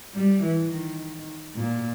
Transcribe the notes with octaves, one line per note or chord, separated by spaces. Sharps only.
G3
E3
D#3
A#2